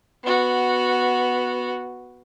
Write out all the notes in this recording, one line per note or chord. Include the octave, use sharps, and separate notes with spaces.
B3 F#4